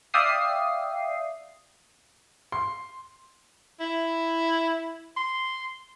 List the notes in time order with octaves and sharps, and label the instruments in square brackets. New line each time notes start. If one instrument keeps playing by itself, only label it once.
[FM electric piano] D5 E5 F5 G5 D#6 C7
[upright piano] C6
[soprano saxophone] E4
C6